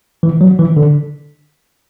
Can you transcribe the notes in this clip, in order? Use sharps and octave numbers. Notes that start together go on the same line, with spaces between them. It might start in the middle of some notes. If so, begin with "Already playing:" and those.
E3
F#3
E3
D3